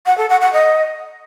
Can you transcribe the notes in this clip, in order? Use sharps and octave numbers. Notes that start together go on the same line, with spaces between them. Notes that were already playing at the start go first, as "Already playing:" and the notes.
F#5
A4
F#5
F#5
D#5